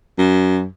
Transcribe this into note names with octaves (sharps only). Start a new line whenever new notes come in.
F#2